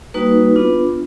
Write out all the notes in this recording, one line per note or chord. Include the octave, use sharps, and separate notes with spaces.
G3 A#3 D#4 F#4 B4
B3 D4 F4